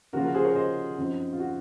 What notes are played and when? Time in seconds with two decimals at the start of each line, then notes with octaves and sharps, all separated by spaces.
0.13 C#3 F3 A#3 C#4 F4 F#4 A#4
0.24 F#4 A#4
0.34 G#4 C5
0.44 A#4 C#5
0.55 C5 D#5
0.98 F#2 F3 C4 D#4
1.33 F4
1.40 F#4